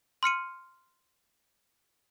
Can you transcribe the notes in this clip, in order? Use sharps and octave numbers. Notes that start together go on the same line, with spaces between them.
C6 F6 C#7 D#7